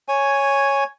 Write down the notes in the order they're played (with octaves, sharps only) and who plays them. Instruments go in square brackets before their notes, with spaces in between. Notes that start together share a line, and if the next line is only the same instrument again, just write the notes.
[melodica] C#5 G#5